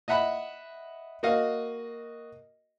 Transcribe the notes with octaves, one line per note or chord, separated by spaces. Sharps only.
D#5 E5 F#5 B5
A#3 F#4 D#5 F5